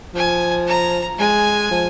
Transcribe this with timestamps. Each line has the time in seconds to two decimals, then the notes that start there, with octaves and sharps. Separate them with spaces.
0.15 F3 G#5
0.67 A#5
1.19 G#3 G#5
1.71 F3